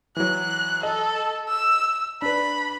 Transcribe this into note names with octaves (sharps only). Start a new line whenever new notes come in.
E3 F#3 F#6
A4 D#5
E6
D4 B4 B5